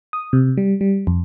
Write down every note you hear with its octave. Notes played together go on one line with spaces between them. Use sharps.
D#6
C3
G3
G3
F2